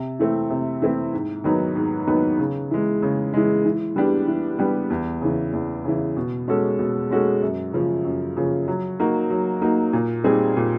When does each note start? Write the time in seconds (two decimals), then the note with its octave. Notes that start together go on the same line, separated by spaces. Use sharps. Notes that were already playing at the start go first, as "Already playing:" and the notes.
Already playing: C3
0.19 E3 A3 C4 E4
0.50 C3
0.82 E3 A3 C4 E4
1.13 G#2
1.44 D#3 F#3 B3 D#4
1.76 G#2
2.07 D#3 F#3 B3 D#4
2.39 C#3
2.71 E3 G#3
3.02 C#3
3.34 E3 G#3
3.65 E3
3.96 G3 B3 D4 G4
4.28 E3
4.59 G3 B3 D4 G4
4.90 E2
5.21 C#3 E3
5.53 E2
5.85 C#3 E3
6.17 B2
6.48 G#3 C#4 F#4 A4
6.79 B2
7.11 G#3 C#4 F#4 A4
7.42 F#2
7.73 C#3 F3
8.05 F#2
8.37 C#3 F3
8.68 F#3
9.00 A#3 D#4 F#4
9.30 F#3
9.61 A#3 D#4 F#4
9.93 A#2
10.24 G3 C4 D#4 G#4
10.57 A#2